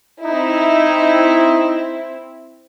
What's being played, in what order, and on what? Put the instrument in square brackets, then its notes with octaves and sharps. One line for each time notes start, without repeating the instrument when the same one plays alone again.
[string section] C4 E4 [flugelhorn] D#4